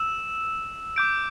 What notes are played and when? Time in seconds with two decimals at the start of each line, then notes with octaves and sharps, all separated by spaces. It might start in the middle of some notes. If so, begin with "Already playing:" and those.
Already playing: E6 E7
0.96 D6 G6 D7